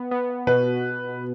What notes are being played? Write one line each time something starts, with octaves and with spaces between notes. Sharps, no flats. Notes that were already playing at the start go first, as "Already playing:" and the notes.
Already playing: B3
B3
B2 B4